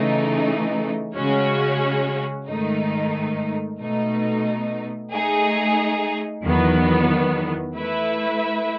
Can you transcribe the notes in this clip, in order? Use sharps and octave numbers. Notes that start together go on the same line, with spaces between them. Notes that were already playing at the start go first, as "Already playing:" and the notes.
Already playing: C#3 E3 A3 D#4
C#3 G#3 C#4 F#4 C#5
G#2 D#3 A3 D#4
B2 A3 D#4
A3 D#4 G#4
E2 D#3 F#3 B3
A3 E4 B4 E5